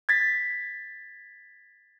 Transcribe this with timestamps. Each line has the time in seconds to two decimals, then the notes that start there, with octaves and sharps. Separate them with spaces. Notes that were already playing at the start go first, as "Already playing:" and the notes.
0.09 G#6 A6 B6